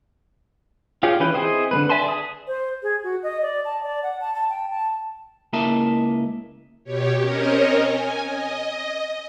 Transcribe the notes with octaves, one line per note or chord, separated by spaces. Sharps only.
F4 G4 G#4 C#5 D5
E3 C#4 B4 G5
C4 E4 G#4 C5 D#5
D3 A#3 B4
D5 E5 G#5 A5 C6
G#4 D#6
C5
G#4
F#4
D#5
D5
A5
D5
F#5
A5
A5
G5
A5
C#2 A#3 E4 D#5 E5 A5
B2 G4 C#5
C4 C#4 A#4 C#5 D#5
G#5
D#5